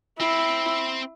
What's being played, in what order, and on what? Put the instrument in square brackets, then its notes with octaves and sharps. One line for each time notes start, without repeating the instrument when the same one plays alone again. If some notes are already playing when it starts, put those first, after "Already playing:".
[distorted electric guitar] C4 [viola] E4